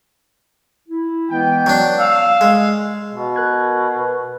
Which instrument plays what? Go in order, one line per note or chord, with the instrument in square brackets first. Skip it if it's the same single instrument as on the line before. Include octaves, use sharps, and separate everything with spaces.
[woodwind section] E4
[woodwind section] E3 G#3 B3 [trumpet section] G5
[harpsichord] F#3 D4
[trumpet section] F5 [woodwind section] E6
[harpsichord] G#3
[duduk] B2
[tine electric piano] A#4 F#6 G#6
B4